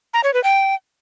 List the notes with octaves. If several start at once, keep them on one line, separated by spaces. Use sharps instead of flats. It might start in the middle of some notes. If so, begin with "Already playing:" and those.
A#5
C#5
B4
G5